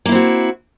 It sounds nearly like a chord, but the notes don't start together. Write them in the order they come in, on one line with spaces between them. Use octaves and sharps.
A#3 E4 C4 F#4